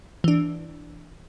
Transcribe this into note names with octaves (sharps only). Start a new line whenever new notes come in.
E3 D4